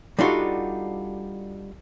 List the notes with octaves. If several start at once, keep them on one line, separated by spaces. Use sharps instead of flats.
G3 D4 D#4 F4 F#4 A4